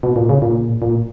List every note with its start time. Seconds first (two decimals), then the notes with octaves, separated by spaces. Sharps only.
0.03 B2
0.16 A#2
0.29 C#3
0.42 A#2
0.82 A#2